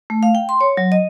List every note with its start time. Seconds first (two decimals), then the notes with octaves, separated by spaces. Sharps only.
0.10 A3
0.23 F5
0.35 G5
0.49 C6
0.61 C#5
0.77 F#3
0.92 D#5